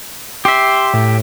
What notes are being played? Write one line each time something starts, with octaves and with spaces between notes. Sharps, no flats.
G4 E5 C6
A2